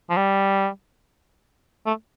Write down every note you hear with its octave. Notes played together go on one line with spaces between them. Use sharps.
F3
G3
A3